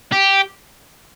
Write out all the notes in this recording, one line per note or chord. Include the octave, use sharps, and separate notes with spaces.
G4